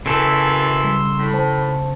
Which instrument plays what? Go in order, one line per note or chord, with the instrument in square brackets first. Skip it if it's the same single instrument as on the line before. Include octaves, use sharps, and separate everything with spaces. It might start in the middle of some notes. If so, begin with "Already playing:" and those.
[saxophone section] F#2 E3 [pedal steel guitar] C#3 A4 [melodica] C6 E6
[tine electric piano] G3
[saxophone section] A2
[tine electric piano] C5 A5